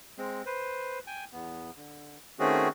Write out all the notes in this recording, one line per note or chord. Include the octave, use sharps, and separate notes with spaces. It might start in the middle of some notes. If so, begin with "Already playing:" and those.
G#3 C4
B4 C5
G5 G#5
E2 B3
D3
D#3 A3 C4 C#4 F#4 G#4